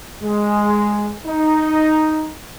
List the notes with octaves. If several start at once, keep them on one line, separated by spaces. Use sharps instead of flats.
G#3
D#4